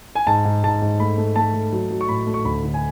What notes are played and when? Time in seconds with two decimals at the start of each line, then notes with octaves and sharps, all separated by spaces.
0.15 G#5
0.27 G#2 A5
0.45 G#2
0.64 G#2 A5
0.82 G#2
1.00 A3 B5
1.18 A3
1.36 A3 A5
1.54 A3
1.73 F#3
1.91 F#3
2.01 C#6
2.08 A2 B5
2.27 A3
2.34 C#6
2.45 D2 B5
2.63 D3
2.74 G#5